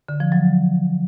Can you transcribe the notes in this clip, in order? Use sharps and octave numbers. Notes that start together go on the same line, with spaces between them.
D3
F3
F#3